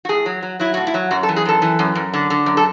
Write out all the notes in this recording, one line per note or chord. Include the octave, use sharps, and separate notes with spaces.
F#4
A2 G#4
F#3
F#3
F#3 E4
A2 F#4
E4
F#3
F#2 F#4
A4
E3
G#4
F#2 A4
E3
F#2
F#2
D3
D3
F#2
A4